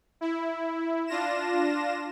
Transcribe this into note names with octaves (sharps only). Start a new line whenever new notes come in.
E4
D4 F4 A#6 E7